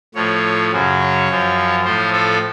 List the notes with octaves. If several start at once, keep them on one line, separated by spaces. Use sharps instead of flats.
A2 F3 C#5
F#2 C#3 F#3
C#5
F#2 F3
A2 F3 C5
A4